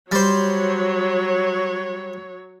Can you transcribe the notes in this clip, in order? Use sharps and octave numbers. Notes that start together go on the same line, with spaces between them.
F#3 G3 C5 C#5